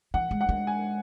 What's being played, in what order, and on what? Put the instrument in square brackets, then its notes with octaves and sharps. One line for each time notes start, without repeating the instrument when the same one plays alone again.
[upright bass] E3 [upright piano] F#5
[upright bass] G#3
[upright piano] F#5
[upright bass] G#3
[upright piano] G#5